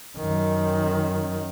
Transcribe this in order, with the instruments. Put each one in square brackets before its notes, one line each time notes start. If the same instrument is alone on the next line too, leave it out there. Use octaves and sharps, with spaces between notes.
[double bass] F#2 D#3